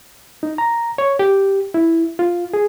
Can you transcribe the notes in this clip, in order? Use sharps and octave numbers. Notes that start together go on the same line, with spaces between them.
D#4
A#5
C#5
G4
E4
F4
G#4